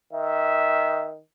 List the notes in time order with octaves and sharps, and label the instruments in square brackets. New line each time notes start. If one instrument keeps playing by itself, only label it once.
[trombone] D#3 [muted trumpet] E5